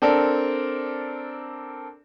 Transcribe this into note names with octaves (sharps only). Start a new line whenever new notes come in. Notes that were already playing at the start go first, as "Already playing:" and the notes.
C4 D4 A4 A#4 D5